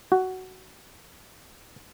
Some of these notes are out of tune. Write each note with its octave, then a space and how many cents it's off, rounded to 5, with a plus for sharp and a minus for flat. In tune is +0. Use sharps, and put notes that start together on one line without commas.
F#4 +10